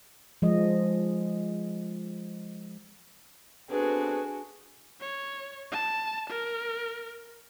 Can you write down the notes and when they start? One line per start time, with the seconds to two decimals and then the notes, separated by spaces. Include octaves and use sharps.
0.42 F3 G#3 D#5
3.70 B3 C4 D4 F#4 G#4 A4 B4
5.00 C#5
5.72 A5
6.30 A#4